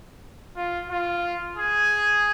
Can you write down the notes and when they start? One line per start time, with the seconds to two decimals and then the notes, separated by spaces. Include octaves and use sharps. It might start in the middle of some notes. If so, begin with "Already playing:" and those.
0.56 F4
0.90 F4
1.56 G#4